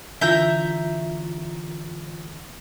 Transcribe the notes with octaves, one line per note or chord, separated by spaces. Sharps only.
D3 E3 F4 E5 A#5 G6